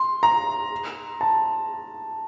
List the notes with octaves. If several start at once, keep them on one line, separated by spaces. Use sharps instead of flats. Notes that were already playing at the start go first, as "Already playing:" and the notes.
Already playing: C6
A#5
A5